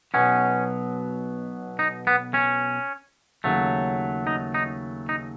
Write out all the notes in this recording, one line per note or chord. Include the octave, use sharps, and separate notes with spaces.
B1 B2 F#3 B3 C#4
D#4
B3
C#4
D#2 C#3 F#3 A3
D#4
D#4
D#4